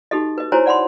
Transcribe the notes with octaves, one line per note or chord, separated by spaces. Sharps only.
D#4 F#4 G4 A4 D#5
B4 D#5
E4 F#4 C5 C#5 G#5 A#5
D5 F#5 B5 C6